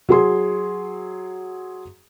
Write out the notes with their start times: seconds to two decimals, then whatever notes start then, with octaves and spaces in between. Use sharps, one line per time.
0.09 F#3 G#4 C6